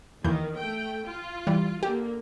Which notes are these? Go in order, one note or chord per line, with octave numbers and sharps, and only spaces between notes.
D#2 D#3 E3 G6
A3 G5
F4
E3 G3
D3 A#3 G4